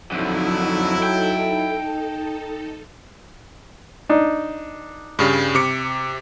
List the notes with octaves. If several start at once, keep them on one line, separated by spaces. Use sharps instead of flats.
F2 D3 F#3 D#4 E4 A4
G5
D4 D#4
G2 C#3 G3
C3 D6 C#7